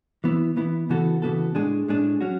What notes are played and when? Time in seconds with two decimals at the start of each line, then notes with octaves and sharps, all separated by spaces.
0.24 E3 B3 E4
0.56 E3 B3 E4
0.89 C#3 E3 B3 F#4 A4
1.22 C#3 E3 B3 F#4 A4
1.55 A2 G#3 D4 G#4
1.88 A2 G#3 D4 G#4
2.21 F#3 C#4 F#4